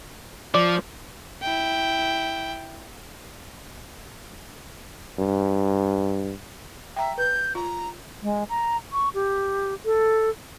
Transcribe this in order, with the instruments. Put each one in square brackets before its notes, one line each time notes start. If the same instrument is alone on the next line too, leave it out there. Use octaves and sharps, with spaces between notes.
[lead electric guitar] F3 [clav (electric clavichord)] D5
[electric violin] E4 G5
[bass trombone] G2
[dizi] E5 [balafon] G5 A#5
[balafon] B4 [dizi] G6
[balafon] F4 [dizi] A#5
[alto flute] G#3
A#5
C#6
G4
A4